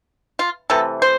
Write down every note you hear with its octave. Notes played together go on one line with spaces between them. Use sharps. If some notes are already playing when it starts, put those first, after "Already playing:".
F4
C3 E3 A3 A4
C5